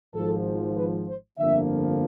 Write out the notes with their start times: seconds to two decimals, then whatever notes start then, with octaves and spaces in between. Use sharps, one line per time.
0.14 G#1 G#2 F3 A4
0.76 B4
1.07 C5
1.38 G1 F2 D3 F3 A#3 E5